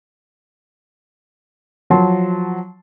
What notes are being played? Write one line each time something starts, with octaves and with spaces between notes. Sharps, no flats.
F3 F#3 A5 C6